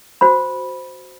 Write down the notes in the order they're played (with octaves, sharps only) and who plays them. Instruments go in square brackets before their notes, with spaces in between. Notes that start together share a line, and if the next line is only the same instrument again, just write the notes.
[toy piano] F#4 C5 B5